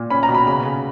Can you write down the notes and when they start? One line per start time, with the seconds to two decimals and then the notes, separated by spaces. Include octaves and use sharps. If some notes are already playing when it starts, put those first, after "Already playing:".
Already playing: A#2
0.10 C#4 B5
0.23 A#5
0.29 B2
0.35 B5
0.47 C#3 B5
0.65 C#3